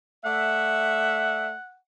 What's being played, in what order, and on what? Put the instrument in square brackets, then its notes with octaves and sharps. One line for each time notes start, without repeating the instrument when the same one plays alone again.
[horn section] A3 D5 E5 [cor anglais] F#5